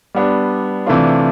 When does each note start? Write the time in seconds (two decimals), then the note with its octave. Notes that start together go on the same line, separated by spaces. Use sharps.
0.15 G3 B3 D4
0.86 C3 E3 A3 D4 F4